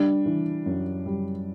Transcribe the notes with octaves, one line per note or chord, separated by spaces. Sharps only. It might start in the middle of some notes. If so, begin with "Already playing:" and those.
Already playing: G3 D4
E3
F#2
G3